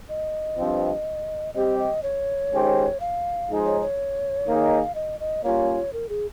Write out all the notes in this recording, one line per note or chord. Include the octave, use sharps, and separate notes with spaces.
D#5
G2 F3 C4
G3 C4 G4 D#5
D#5
C#5
D#3 G#3 C#4 G4 C5
F5
F3 G#3 D#4 G#4 C5
C#5
C#5
D#3 A#3 D#4 G#4
F5
D#5
D#5
G3 A#3 C#4 F4 C#5
A#4
G#4